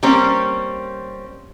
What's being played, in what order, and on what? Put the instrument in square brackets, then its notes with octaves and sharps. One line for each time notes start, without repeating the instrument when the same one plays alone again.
[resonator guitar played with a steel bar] G3 A#3 C4 C#4